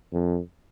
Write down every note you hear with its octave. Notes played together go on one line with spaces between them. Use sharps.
F2